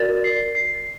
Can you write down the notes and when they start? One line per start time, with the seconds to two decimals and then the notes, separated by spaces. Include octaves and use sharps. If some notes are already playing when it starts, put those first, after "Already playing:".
Already playing: F#4 A#4 D5 A6
0.24 C7
0.55 C7